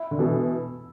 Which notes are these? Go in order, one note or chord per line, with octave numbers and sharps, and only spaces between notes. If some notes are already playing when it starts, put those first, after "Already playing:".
Already playing: E4
D3
B2 E3 A4